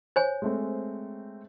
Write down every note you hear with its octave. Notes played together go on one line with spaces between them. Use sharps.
C5 C#5 G#5
G#3 A3 C4